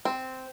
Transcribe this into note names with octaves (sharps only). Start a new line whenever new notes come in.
C4